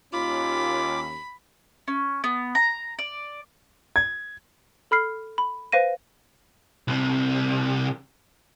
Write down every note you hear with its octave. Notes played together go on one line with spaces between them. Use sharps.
D#2 C#4 F4 B5 D6
C#4
B3
A#5
D5
G#6
A4 B5 F6 C7
B5
B4 C5 F5 A#6 D#7
C2 C3